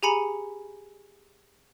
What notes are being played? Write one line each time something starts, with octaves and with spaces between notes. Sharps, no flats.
G4 G#4 G#5 A#5 B5 C#7